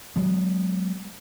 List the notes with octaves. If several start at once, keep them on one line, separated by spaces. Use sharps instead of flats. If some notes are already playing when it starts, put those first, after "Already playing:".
F#3 G#3 B3